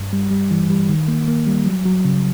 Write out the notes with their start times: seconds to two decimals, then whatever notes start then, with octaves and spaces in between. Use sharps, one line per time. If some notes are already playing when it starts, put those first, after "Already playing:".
Already playing: G2
0.13 G3
0.31 G3
0.51 E3
0.70 G3
0.89 D#3
1.08 A#3
1.28 A#3
1.47 G3
1.66 F#3
1.85 F#3
2.05 C#3